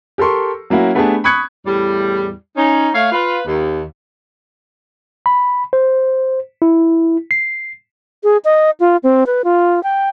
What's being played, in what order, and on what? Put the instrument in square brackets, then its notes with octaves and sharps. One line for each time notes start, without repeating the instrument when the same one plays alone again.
[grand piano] G4 A4 A#4 C6 C#6
F#3 A#3 C#4 E4 F#4
A3 B3 D4 G4 G#4 A5
B5 C#6 D#6 F#6 G#6 C#7
[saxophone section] E2 A2 G3
C#4 D#4
A3 C#5 F5
F4 B4
D#2
[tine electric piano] B5
C5
E4
C7
[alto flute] G#4
D#5
F4
C4
B4
F4
G5